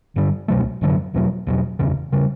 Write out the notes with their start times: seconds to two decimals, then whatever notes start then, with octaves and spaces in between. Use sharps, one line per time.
0.16 G1 G2 D3 G3
0.48 C#2 B2 F#3 A3
0.81 F#1 F#2 D3 F#3
1.14 E1 E2 B2 F#3
1.47 E1 E2 B2 F#3
1.79 F#1 E2 C#3 E3
2.12 C#3 G3